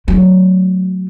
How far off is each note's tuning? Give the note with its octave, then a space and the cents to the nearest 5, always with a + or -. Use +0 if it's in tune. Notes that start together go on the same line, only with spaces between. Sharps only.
F#3 +0 A3 +0